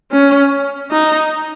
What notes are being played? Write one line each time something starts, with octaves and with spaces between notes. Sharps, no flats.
C#4
D#4